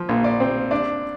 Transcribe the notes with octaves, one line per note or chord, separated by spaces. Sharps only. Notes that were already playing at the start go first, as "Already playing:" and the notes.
Already playing: F3 C5
A#1
D5
C4
D4 D5